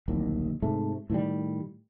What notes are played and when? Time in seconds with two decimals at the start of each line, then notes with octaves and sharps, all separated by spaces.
0.08 D1 A#1 D#2
0.62 G#2 C3 A3
1.10 A2 D#3 E3 G3